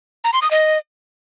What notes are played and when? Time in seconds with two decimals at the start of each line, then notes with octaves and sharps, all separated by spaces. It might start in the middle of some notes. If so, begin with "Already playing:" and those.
0.24 A#5
0.33 C6
0.42 D#6
0.51 D#5